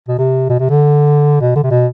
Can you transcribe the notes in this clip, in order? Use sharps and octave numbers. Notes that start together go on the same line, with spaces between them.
B2
C3
B2
C3
D3
B2
D3
C3
B2